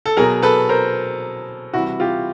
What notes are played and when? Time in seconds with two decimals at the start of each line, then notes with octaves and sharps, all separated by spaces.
0.06 A4
0.17 B2 F#3 G#4 A#4
0.42 A4 B4
0.69 A#4 C5
1.73 C3 E3 G3 E4 F#4
2.00 F4 G4